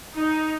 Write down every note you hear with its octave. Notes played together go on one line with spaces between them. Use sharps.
D#4